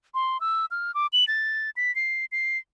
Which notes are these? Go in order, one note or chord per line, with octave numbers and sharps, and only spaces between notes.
C6
E6
F6
D6
F#7
A6
B6
C7
C7